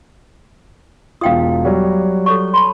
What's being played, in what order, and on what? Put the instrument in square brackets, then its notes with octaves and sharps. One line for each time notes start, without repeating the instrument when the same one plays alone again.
[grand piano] E1 F4 [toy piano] F5 G5 D#6
[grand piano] F#3 G3
[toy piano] A4 C#5 C#6
A5 B5 C6